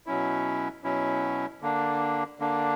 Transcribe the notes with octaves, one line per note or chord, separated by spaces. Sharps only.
B2 F#3 C#4 E4
B2 F#3 C#4 E4
D3 A#3 D4
D3 A#3 D4